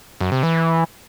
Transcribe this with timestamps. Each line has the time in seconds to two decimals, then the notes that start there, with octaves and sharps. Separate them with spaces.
0.21 F#2
0.32 C3
0.43 E3